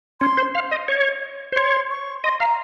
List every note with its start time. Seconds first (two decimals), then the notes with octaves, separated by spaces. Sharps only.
0.20 C#4 C6
0.37 C5
0.55 F5
0.71 D#5
0.88 C#5
1.52 C5
1.56 C#5 C6
1.90 C#6
2.23 D#5 C6
2.40 F5 A#5